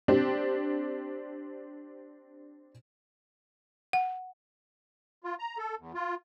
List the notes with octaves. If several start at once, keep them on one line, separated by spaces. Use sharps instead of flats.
C4 D4 G4
F#5
F4
A#5
A4
E2
F4